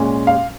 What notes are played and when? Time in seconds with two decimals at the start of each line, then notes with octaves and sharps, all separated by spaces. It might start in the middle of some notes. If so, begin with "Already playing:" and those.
Already playing: A#2 G#3 C#4
0.27 F5